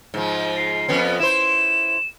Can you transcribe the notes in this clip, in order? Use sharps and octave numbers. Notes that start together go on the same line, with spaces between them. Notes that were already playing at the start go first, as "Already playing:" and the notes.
G#2 F3
C7
F2 B3 C#4
E4 C5 E7